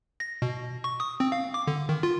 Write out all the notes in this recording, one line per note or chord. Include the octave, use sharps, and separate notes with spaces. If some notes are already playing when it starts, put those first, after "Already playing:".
A#6
B2
C#6
D#6
C4
F5
D6
D3
D#3
F4